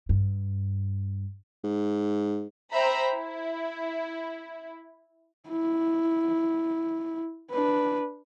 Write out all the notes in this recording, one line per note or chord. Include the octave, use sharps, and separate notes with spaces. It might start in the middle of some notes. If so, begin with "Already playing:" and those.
G2
G#2
C5 E5 G5 A#5 B5
E4
E4
D4 B4